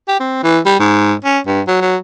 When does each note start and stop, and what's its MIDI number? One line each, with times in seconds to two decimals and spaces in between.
0.08 0.20 67
0.20 0.42 60
0.43 0.59 52
0.66 0.77 55
0.79 1.13 44
1.24 1.39 61
1.47 1.61 43
1.67 1.76 54
1.81 1.96 54